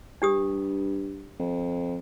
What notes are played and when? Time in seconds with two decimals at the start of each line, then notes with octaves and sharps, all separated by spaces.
0.22 G2 D4 G4 D#6
1.39 F2